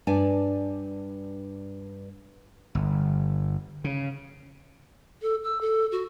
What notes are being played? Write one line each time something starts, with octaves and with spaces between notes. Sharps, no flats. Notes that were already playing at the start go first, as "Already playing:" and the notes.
G2 D4 D5 G#5
G1
C#3
A4
E6
A4
F#4